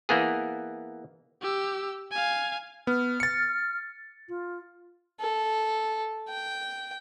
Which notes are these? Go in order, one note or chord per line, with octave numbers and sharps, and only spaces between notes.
E3 A#3 B3 G#4
G4 E6
F5 G#5
B3 F6
A6 C#7
F4
A4
G5